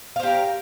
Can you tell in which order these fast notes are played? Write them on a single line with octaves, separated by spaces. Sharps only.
F5 C5 G4 A#4